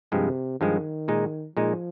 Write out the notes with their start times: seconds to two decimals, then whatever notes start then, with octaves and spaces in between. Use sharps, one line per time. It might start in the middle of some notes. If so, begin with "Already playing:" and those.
0.12 G2 C3 F3 G#3
0.60 G2 D#3 F3 G#3
1.08 A#2 G#3 D#4
1.56 A#2 F3 G#3 D#4